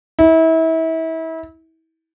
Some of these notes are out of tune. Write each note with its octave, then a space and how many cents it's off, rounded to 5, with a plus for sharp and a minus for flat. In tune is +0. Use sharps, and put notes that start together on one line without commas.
E4 -30